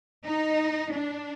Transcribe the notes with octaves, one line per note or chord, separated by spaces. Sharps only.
D#4
D4